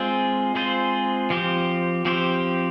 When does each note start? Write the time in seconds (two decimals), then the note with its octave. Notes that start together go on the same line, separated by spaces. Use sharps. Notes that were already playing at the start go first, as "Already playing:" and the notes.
Already playing: G#3 C4 F4 G#4 C5
0.55 G#3 C4 F4 G#4 C5
1.30 F3 C4 G4 C5
2.05 F3 C4 G4 C5